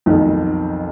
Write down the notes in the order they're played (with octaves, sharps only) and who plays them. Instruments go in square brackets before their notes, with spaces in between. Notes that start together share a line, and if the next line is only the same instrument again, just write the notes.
[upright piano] B1 F2 D#3